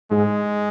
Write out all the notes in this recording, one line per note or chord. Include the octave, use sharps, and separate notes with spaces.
G#2 G#3